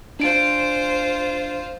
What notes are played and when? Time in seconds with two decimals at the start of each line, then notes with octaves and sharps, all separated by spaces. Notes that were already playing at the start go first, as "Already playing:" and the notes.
0.20 D4 F4 C5 D7